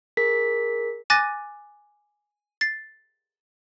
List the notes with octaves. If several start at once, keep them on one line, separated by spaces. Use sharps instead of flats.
G#4 A#4 B6
G#5 D6 F#6 A6 A#6 D#7
A6 C7